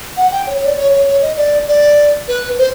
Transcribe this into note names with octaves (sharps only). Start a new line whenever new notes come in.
F#5
G5
C#5
C#5
D5
C#5
C#5
C#5
D#5
D5
D5
B4
C5